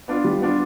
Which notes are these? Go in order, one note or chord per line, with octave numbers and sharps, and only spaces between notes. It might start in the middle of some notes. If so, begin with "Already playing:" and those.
B3 D4 F4
G3
B3 D4 F4